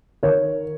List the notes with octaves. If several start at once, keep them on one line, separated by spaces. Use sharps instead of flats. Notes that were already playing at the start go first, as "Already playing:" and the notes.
D#3 A#4 C#5